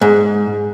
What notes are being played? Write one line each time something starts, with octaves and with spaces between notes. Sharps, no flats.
G#2